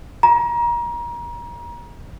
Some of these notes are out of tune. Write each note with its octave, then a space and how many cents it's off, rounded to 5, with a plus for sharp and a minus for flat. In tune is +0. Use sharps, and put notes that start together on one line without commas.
A#5 +30